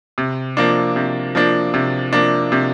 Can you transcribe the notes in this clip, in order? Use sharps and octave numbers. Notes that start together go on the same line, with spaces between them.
C3
F3 A#3 D4
C3
F3 A#3 D4
C3
F3 A#3 D4
C3